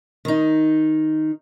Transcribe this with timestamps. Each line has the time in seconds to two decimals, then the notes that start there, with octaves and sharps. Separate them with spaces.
0.25 D#3 D#4